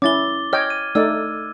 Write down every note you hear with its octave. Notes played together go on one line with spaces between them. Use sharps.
C#4 E4 D6 A6 G7
C#5 D#5 G5 F6 G#6
D#7
A3 D#4 D5 E6